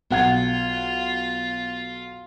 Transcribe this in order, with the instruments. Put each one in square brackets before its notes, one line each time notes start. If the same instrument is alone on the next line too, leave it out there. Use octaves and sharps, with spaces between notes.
[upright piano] B1 F#5 G#6 [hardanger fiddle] F4